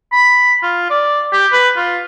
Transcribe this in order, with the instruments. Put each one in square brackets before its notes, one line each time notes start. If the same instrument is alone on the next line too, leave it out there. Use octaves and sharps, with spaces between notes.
[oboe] B5
F4
D5
G4
B4
F4